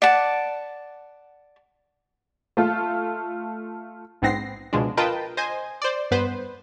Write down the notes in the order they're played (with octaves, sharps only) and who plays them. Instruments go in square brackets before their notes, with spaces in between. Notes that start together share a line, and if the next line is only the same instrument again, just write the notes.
[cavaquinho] D5 F#5 A5
[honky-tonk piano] A3 F4
[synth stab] A#1 G#2 B3 C4 A#6 C7
C#2 B2 F3 G#3 D4
F4 A#4 B4 D#5 G5 A5
C5 D#5 G#5
C5 D5
G2 B3 B4 C5